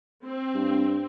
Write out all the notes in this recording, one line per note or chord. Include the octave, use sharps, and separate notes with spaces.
C4
G2